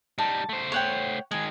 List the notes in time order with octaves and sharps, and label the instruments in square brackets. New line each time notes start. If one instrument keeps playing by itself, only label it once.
[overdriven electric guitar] G3 D#4 [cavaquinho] A5
[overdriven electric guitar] A3 C5
[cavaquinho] C#5 F#5 G5
[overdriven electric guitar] D#3 G#3 [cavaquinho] G#5